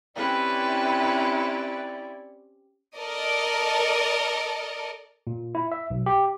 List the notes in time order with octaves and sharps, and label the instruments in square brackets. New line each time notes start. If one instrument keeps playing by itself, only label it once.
[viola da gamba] C4 C#4 G4 [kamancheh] E4 [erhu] B4 [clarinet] D5
[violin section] A4 A#4 D5 D#5
[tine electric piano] A#2
E4
E5
B1
G4